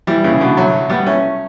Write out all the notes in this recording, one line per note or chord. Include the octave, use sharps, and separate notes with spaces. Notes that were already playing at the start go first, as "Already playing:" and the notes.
E3 G3
C#3 E3
B2 D3
F#3 A3
G3 B3
A3 C#4